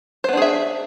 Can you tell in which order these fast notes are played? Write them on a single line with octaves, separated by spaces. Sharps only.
C5 B3 D4 G#4 E5